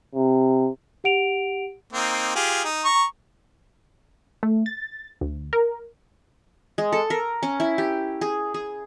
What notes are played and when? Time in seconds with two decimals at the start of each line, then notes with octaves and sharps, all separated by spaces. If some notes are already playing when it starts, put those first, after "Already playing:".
0.15 C3
1.04 G4 F#5 D7 F7
1.93 A#3 C4 D#4
2.35 F4 G4 G#4
2.64 D#4
2.85 A#5 C#6
4.43 A3
4.66 A6
5.21 D2
5.53 A#4
6.78 G#3
6.92 A4
7.10 A#4
7.43 C#4
7.60 E4
7.78 G4
8.21 G#4
8.54 G#4